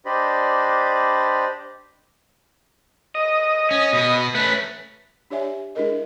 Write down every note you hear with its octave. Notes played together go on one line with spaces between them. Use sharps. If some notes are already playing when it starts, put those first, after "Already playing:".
D4 G4 C5 D5 D#5 B5
D#5
C#4
B2 B3
A3 C#4 B4
D4 G4 C#5 D5 E5 G#5
G#3 D4 E4 G#4 A#4 D#5